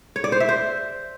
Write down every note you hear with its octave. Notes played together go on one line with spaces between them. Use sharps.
C#5
D5
C5
E5
C5